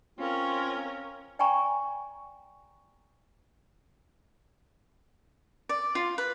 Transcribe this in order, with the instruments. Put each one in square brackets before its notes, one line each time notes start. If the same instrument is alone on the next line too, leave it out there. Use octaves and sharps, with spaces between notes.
[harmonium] C4 F4 [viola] C#4 A#4
[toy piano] D5 G5 G#5 A#5 C#6
[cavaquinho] D5
F4
B4